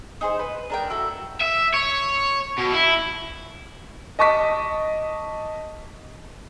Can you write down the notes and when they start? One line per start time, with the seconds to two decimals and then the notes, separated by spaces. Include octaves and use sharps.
0.21 D#4 G#4 C5
0.39 B4
0.70 D4 A#4 G5
0.90 E4 F#4 A4
1.41 E5
1.74 C#5
2.58 B2
2.72 E4
4.19 D#5 A5 C#6 D6 B6